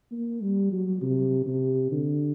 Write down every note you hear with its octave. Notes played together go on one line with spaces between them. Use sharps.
A#3
G3
F#3
C3
C3
D3